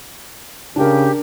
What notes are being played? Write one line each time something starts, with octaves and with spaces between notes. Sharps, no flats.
C#3 D4 G4 A#4